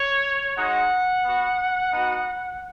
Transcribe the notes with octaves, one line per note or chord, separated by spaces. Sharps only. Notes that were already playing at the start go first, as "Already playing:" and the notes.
Already playing: C#5
G#3 D#4 F#4 F#5
B3 F#4
B3 D#4 F#4